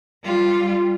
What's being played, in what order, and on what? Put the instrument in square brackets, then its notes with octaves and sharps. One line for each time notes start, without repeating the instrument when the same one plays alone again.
[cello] G3 F4